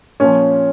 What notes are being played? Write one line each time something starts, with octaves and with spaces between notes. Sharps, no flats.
A#2 F3 C#4